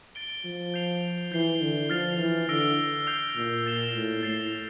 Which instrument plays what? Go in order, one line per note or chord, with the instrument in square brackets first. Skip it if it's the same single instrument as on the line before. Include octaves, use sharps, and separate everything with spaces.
[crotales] A6 D7 G7
[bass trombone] F3
[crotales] G6 C7 F7
[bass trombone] E3 [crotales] G6 C7 G7
[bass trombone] D3
[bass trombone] F3 [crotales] F6 A6 C7 F7
[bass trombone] E3
[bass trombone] D3 [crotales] E6 A#6 D7 G7
[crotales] E6 G6 C7 F7
[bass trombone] A#2
[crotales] E6 A6 C7 E7 G7
[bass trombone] A2
[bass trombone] A2 [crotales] A6 C7 F7